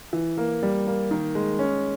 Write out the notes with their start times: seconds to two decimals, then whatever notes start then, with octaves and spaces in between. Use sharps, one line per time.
0.13 E3
0.37 A#3
0.63 G3
0.87 A#3
1.11 D#3
1.35 G#3
1.59 C#4